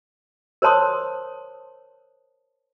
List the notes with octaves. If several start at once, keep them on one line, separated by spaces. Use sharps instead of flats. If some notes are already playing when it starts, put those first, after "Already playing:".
A#4 C5 C#5 A5 C6 D#6